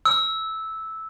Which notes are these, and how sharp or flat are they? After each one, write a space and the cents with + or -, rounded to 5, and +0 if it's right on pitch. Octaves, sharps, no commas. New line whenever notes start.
E6 -10